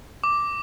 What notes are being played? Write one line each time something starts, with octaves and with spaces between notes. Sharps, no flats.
D6